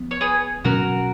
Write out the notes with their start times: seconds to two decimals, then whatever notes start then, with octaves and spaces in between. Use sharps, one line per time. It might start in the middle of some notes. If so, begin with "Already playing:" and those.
Already playing: F3 B3
0.11 C#5
0.21 G#4 B4
0.65 B2 F#3 C#4 F#4 A#4